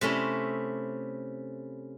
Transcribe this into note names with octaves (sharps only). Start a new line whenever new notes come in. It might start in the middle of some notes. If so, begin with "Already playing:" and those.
C3 A3 C#4 E4